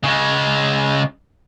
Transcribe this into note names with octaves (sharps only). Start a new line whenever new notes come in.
C#3 G#3